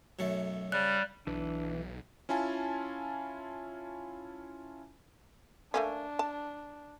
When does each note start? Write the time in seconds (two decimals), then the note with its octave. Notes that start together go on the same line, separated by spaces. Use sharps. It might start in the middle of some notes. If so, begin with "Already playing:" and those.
0.19 B1 F#2 A3
0.72 C#3 G3 F#6
1.27 B1 E3 D4
2.29 C#4 E4 F4 G#5 A5
5.74 A3 A#3 C#4 D4
6.19 A5